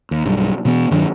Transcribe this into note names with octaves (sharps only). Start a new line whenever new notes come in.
D#2
B1 G2
B2 E3 B3
G2 D#3 F#3 D4